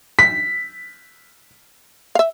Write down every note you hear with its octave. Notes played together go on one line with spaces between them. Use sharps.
B6
E5 F5